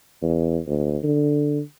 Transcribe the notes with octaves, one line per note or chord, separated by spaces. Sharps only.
E2
D2
D3